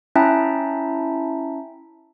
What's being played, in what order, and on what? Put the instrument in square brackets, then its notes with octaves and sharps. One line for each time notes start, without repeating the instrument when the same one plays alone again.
[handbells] C#4 E4 E5 G5 A5 A#5